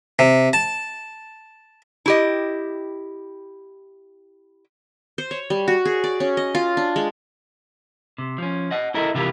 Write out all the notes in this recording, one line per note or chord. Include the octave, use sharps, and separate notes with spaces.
C3
A5
E4 G4 D#5
C5
C#5
G3
F#4
G#4
D5
C#4
D#5
F4
D4
G#3
C3
F3 C#4
D#5 F#5
E4 A4 A#4 D#5 E5
C3 E3 E4 F4 G4 A#4